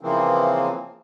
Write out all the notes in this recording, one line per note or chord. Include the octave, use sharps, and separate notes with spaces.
C#3 E3 F3 A#3 C4